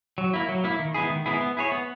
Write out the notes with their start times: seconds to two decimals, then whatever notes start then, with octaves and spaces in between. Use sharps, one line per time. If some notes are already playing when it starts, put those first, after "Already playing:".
0.18 F#3
0.34 A#3 E4
0.49 F#3
0.64 A#3 E4
0.79 D#3
0.94 G#3 B3 E4 G#4
1.10 D#3
1.26 G#3 B3 E4 G#4
1.41 B3
1.57 E4 G#4 C#5
1.72 B3